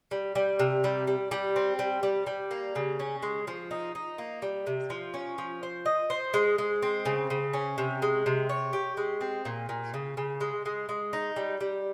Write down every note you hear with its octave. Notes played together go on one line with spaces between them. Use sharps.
G3
G3
C3
G3
G3
G3
C4
G3
G3
G3
A#3
C#3
C#4
G#3
F3
D#4
D#4
A#3
G3
C3
F3
C#4
F3
C5
D#5
C5
G#3
G#3
C4
C#3
C#3
C#4
C3
G#3
C3
C#5
G4
G#3
C4
A#2
A#2
C#3
C#3
G#3
G#3
G#3
D#4
G3
G3